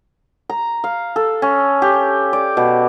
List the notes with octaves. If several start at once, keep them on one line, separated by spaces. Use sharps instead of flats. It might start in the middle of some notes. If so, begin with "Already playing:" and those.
A#5
F5
A4
C#4
G4
D5
B2